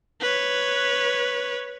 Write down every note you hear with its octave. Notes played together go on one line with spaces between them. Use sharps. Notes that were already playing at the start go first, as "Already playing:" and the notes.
B4 C#5